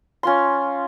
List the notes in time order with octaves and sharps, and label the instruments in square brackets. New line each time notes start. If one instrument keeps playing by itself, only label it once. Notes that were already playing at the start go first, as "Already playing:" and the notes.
[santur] C#4 F4 C6